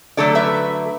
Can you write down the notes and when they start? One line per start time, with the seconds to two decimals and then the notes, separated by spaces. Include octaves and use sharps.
0.17 D3 F#3 A3 A4 D5
0.35 B4 E5